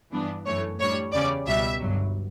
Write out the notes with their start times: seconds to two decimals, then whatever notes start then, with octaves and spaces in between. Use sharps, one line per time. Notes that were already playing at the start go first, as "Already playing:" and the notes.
0.12 G2 E3 B3 D4
0.46 F#2 E3 A3 C#5
0.80 A2 G3 D4 C#5
1.13 E2 C#3 G3 C#4 D5
1.47 C#2 B2 G3 E5
1.80 G1 G2 F#3